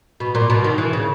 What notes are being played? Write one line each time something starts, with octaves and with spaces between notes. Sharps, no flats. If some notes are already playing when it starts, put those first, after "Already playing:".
B2
A#2
B2
D#3
E3
C#3